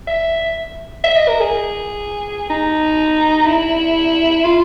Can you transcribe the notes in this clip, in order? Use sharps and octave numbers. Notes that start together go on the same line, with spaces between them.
E5
E5
D#5
A#4
G#4
D#4
E4
F4